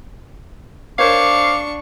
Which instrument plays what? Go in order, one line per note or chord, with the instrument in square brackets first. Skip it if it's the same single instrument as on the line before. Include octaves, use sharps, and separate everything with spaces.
[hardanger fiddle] D4 C#6 [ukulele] A#4 C5 C#5 [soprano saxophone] F5 [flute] D6